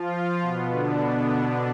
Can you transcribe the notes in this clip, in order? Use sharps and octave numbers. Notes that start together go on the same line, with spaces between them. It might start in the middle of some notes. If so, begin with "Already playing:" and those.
Already playing: F3 F4
F3 F4
B2 B3
D3 D4